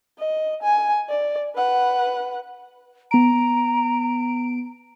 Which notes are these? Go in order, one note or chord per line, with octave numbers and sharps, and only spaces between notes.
D#5
G#5
D5
B4 F#5
B3 A#5 D7